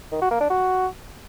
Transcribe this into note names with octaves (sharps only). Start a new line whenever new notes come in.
D#3
F#4
A#3
D4
F#4